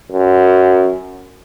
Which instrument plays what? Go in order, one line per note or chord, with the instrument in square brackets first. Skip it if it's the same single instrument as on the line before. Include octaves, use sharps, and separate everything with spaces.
[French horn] F#2